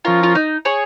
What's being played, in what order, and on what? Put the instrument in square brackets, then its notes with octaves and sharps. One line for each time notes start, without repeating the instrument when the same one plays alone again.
[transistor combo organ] F3 C#4 A#4 [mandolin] F4
[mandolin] F4
D#4
G#4 C#5